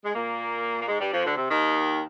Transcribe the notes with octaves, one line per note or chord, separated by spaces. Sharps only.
G#3
A#2 A#3
A#3
G#2 G#3
G2 G3
F2 F3
D2 D3
C3
D#2 D#3